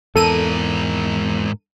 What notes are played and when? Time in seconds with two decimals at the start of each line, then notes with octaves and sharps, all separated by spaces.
0.16 E2 G#2 A4 A#4 D#7